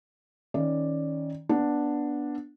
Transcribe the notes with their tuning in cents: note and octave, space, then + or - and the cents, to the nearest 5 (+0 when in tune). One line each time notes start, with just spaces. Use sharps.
D#3 +25 C#4 +0 D5 +5
B3 -10 D4 +0